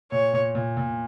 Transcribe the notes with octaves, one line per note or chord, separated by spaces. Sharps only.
A#2 C#5
A#2
A#2
A#2